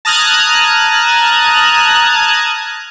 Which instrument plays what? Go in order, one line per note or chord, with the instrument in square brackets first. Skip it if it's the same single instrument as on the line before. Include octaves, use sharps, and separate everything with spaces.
[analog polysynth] A5 A#5 D#6 F6 F#6 G#6